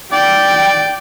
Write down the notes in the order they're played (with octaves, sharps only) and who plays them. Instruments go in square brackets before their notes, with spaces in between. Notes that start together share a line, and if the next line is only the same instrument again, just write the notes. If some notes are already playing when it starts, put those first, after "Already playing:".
[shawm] D5 [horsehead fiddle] G5